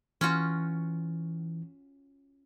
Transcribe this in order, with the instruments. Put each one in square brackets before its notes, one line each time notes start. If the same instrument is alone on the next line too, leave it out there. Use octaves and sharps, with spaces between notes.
[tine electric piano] E3 [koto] C#4 F4 F#4